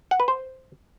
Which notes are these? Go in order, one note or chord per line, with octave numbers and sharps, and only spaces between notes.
F#5
B4
C5